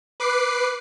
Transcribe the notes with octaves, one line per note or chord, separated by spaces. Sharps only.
B4 D6 C7